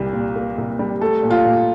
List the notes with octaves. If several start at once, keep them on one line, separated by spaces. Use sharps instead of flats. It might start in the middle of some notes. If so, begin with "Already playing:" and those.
Already playing: C2 A#2 G3 A#3
A#2
A#3
C2
G3
A3 A4
A#2
F4
A#2